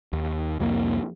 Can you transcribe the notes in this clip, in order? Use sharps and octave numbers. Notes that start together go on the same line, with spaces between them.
D#2
C2 F2 F#3 A#3